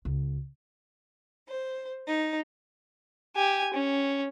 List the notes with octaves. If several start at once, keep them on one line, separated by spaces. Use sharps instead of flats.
C#2
C5
D#4
G4 G#5
C#4